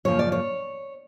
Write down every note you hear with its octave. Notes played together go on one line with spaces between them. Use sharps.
F#2 C#3 F3 A#3 C#5
D5
C#5